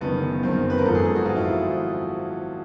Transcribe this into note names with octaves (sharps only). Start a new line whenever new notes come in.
F#1 F#2 D#3 B3
F#1 F#2 D#3 C4
B4
A#4
G#1 G#2 F3 A4
G#4
G#4
F#4
G#1 G#2 F3 F4
E4